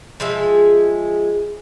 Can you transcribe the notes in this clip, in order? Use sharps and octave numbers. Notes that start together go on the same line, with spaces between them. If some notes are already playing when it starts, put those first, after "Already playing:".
F3 G#3 G#4 E5